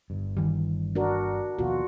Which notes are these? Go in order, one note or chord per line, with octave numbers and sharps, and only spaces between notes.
G1 G2
D#3 E3 G3
D4 F#4 A#4
D#2 B2 F3 F4 F#4